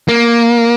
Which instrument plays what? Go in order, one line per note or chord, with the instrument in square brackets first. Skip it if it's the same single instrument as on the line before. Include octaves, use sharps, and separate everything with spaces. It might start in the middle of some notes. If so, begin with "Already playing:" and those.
[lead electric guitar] A#3